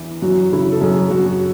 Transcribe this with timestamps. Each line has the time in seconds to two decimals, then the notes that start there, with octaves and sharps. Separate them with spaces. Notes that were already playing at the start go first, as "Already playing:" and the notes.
Already playing: E2 E3
0.22 F#2 F#4
0.53 C#3 E4
0.72 A4
0.81 F#2 G#4
0.96 G#4
1.11 F#2 F#4
1.26 F#4